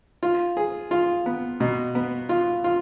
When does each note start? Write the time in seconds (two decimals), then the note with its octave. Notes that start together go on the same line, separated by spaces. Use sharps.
0.23 F4
0.57 G#4
0.91 F4
1.26 B3
1.60 B2
1.95 B3
2.29 F4
2.64 F4